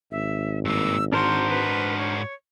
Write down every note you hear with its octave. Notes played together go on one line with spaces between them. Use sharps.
G#1 E5
G2 A#3 E6
G#2 D4 F#4 A#4 C5 C6
B4
C#5